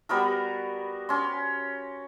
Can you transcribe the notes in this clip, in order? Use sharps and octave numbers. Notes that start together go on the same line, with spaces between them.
G3 B3 F#4 A#4
C#4 C6